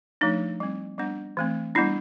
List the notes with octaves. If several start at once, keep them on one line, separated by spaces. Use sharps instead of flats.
F3 A3 D4 D#4
G3 C4
G3 B3 D4
E3 A3 C4
G3 B3 D4 E4